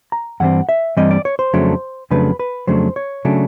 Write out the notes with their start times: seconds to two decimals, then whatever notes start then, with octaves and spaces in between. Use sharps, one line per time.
0.12 A#5
0.40 G2 E3 G3 C4 F#5
0.69 E5
0.97 G2 E3 G3 C4 D#5
1.11 D5
1.25 C#5
1.39 C5
1.53 F2 C#3 F#3 A3 D4
2.11 F2 C#3 F#3 A3 D4 B4
2.39 B4
2.67 F2 C#3 F#3 A3 D4 C5
2.96 C#5
3.25 C#3 F#3 A3 D4